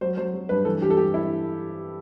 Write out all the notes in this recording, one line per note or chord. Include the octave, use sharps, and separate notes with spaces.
F#3 C5
F#3 C5
F#3
G2 B4
E3 A4
G2 G4
A4
G2 G4
E4